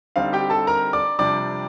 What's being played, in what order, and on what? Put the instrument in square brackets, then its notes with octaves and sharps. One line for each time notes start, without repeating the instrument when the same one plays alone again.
[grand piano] D3 G3 C4 D#4 F5
G4 G5
A4 A5
A#4 A#5
D5 D6
F2 C3 G3 D4 D5 D6